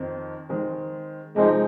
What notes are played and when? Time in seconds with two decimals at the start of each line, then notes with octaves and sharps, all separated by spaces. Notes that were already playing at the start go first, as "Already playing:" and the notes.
Already playing: F2 D#3 C4 D#4
0.49 D#3 G#3 C4
1.36 C3 F3 G#3 C4 D#4